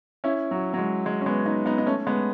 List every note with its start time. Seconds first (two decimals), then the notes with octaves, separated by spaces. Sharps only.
0.24 C#4 E4
0.51 F#3
0.74 F#3
0.78 G#3
1.06 G#3
1.21 C#4
1.26 G#3 B3
1.46 B3 D#4
1.66 B3 D#4
1.78 D#4
1.86 A3 C#4
2.07 G#3 B3